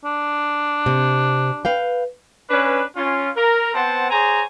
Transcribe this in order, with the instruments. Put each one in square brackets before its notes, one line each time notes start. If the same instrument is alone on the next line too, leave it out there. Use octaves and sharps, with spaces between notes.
[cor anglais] D4
[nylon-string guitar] C3
B4 F5 G5
[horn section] C#4 D4 B4
C#4 F4
A#4
B3 C4 C5 F#5 A5
G#4 C5 C#5 G#5 A#5